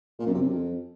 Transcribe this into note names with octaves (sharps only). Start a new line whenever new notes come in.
A#2
F#2
C3
F#2
F2